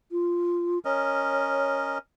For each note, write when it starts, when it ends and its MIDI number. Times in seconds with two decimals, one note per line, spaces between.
0.12 0.79 65
0.85 1.98 61
0.85 1.98 70
0.85 1.83 73
0.85 1.98 75